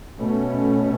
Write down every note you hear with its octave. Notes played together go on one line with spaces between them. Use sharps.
B2 A3 C#4